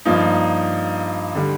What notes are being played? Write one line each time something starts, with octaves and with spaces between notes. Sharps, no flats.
G2 F3 A#3 D#4
D3 G3